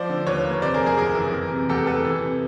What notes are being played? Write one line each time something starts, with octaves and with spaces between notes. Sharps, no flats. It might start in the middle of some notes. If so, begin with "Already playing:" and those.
Already playing: F3 C5 D5
D3
D#2 B4 C#5
A#3
C3 C5 D5
G#4 A#4
F2
G#4 A#4
F#1 G#4 A#4
E3
E3
C3
E2 G4 A4
E2 A4 B4
E3
C3